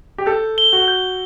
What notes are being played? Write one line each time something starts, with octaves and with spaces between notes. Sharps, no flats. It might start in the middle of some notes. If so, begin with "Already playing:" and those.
G4
A4 G6
G7
F#4
G6